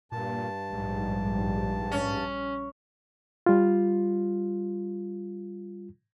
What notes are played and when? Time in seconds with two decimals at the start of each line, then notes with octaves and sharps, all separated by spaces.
0.12 G2 A#2 A5
0.73 A#1 G#2 G3
1.92 C#4
3.46 G3 F4